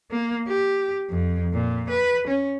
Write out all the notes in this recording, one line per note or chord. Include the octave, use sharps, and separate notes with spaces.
A#3
G4
F2
A#2
B4
C#4